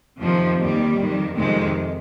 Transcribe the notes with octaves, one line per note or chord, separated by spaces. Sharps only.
F2 C3 D#3 F3
D#2 D#3 G3
F2 D#3
F2 C3 D#3 G#3